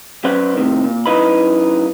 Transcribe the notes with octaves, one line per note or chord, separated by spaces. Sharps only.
F#3 C#4 B4 C5 D5 F#5
A2 C3 D#3
A#2
F#2 D#4 E4 B4 D#5 B5